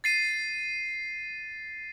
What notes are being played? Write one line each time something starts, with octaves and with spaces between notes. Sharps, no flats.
A6 C7 D#7